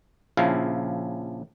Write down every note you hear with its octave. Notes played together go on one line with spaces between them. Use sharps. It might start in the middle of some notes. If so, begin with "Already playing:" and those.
A#1 C#3 F3 E4 F5